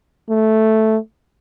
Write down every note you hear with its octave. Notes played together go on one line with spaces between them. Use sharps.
A3